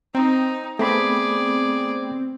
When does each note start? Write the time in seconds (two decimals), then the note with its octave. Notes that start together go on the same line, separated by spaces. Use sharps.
0.15 C4 D#4
0.79 A3 B3 C4 G#4 D5 B5